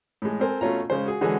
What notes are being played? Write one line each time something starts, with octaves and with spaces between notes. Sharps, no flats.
A2 G#3
C4 A4 A#4 C5 G#5
B2 A3 C#4 F4 A#5
C#3 G#3 C5
F#4 G#4
D3 E3 G#3 C#4 F#4 G#4